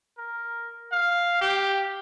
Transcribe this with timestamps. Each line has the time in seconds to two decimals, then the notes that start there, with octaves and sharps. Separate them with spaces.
0.18 A#4
0.92 F5
1.41 G4